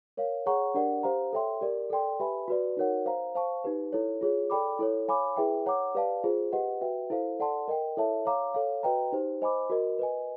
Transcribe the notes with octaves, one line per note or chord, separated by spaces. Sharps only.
A#4 C#5 F5
G#4 C#5 F#5 A#5 C#6
D4 G4 A#4 D5 F#5
G4 C5 F5 A#5
A4 C#5 E5 G5 C6
G4 A#4 D5
A4 D5 G5 C6
G4 B4 E5 G#5 B5
F#4 B4 D5
D#4 F#4 A#4 C#5 F#5
C5 F5 A#5
C5 F5 A5 C#6
D#4 G4 B4
E4 A4 C#5
F4 G#4 C#5
A4 D5 G5 B5 D6
E4 A4 C#5
C#5 F5 G#5 B5 D6
E4 G#4 B4 E5 G5
C#5 F#5 A#5 D6
G4 B4 D5 F5 A5
F4 G#4 C5
G4 B4 D#5 F#5
F#4 B4 E5 G5
E4 A4 C5 F5
A4 D5 F#5 A5 C6
A#4 D#5 G5
E4 A4 C#5 E5 A5
C#5 F5 A#5 D6
A4 C#5 F5
F#4 B4 D#5 G5 A#5
D#4 G4 C5
C5 D#5 G#5 B5 D6
F#4 A#4 D#5
B4 D#5 G#5